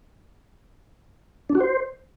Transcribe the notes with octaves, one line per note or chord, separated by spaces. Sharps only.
D4
F#4
C5